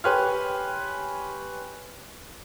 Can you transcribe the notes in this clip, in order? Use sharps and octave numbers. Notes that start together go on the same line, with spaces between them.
G4 B4 C#5 G#5 C6 F6